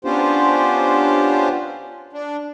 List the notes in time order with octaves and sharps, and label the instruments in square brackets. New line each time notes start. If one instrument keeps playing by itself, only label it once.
[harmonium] B3 C#4 D4 F4 G4 C5
D4